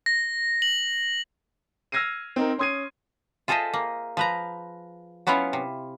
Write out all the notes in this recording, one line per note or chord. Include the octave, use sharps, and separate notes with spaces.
A#6
F#7
E6 F6 G#6 A#6 C7 D#7
C4 D#4 A#4
C#4 C6 D#6 G#6 C7 D#7
F4 G#4 A4 C5 D#5 E5
A#3
F3 B4 A#5
F#3 B3 C#4 E4 F4 C#5
C3